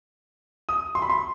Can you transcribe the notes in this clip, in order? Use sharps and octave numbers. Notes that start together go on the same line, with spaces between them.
D#6
C6
B5
C6